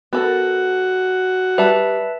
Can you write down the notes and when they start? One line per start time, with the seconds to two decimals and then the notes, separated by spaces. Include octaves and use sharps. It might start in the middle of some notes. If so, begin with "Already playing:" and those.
0.13 B3 F#4 A4 A#4
1.58 G3 B4 E5 A5